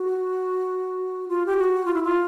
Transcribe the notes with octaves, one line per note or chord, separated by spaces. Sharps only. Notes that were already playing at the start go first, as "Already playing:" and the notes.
Already playing: F#4
F4
G4
F#4
F4
E4
F4